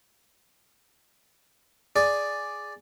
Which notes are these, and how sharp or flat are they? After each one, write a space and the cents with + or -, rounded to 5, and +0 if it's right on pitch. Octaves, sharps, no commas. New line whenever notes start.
G#4 +0 D5 +0